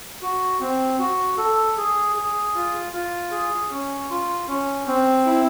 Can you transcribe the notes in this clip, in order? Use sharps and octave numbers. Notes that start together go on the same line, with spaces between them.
F#4
C4
F#4
A4
G#4
G#4
F4
F4
G#4
C#4
F4
C#4
C4
E4